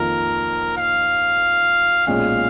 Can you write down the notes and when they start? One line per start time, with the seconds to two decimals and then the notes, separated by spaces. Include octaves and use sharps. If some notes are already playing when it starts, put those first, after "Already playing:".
Already playing: F2 D#3 A#3 F4 A#4
0.78 F5
2.07 B1 A#2 G#3 C#4 F5